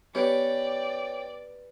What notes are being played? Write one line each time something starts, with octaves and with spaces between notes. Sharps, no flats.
B3 C#4 G4 D5 G5